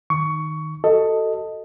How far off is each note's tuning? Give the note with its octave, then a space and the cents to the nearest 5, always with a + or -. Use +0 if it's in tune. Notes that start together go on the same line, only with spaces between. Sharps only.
D#3 +0 C#6 +15
F#4 +45 A4 +15 D#5 +0